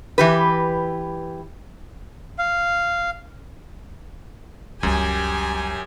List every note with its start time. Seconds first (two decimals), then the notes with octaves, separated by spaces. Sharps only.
0.18 E3 G4 B4
2.38 F5
4.83 C#2 F#2 G3 G4 G#5